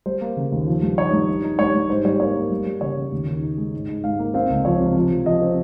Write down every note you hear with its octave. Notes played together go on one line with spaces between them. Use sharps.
G3 C5
A#3
C#3
D#2
F3
G2
D#4 C#5
G2
D#4
D#4
G2 C#5
G2
G#2 C5
G3 C#5
A#3 C#5
A#3
G3
G3
C#3 C#5
C#3
D#2
D#3
D#4
G#3
G#2
G#2
G#2 F5
A#3
C4 F5
C#2
F3 C#5
C3
F3
F3
F3 D#5
C4